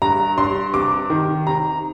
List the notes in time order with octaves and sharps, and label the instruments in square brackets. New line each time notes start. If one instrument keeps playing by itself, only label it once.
[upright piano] G2 A#5
G2 C6
C3 D6
D#3
C3 A#5